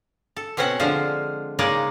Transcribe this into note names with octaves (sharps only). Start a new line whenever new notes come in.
A4
B2 C4 C#4 C5 F#5
D3 F3 G#3 F4 C5
C#3 G#3 A#3 D#4 D5